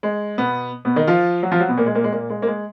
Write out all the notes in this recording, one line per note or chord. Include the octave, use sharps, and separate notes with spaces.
G#3
B2 B3
B2 B3
D#3 D#4
F3 F4
F#3 F#4
F3 F4
F#3 F#4
B2 B3
A#2 A#3
G#3
A#2 A#3
G#3
A#2 A#3
G#3
A#3
G#3